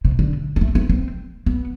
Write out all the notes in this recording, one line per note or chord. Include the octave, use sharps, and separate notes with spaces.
C3
D3
B3
A3
B3
C4
B3